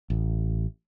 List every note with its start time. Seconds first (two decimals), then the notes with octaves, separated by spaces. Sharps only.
0.10 A1